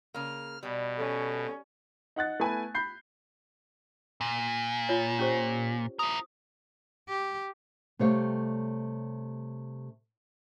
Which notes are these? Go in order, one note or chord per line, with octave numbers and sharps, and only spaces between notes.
C#3 A#3 F6
B2 G3
C#4 A4
D#4 F#5 F#6 A6
A3 B3 E4 B4 G#5
B5 G6 C7
A#2
F4 C#5
C#4 G4 C5
E4 A#4 D#6
G4
C3 G3 A3 G4 C#5 F5